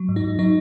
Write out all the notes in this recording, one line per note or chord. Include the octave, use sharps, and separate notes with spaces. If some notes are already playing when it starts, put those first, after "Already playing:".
Already playing: F#3
G#2
D#4
G#2
F#3 D#4